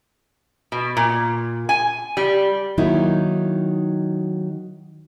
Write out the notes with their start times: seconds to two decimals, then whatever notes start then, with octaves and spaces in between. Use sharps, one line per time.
0.72 B2
0.97 A#2
1.69 G#5
2.17 G3
2.78 D#3 F#3 A#3 D#4 E4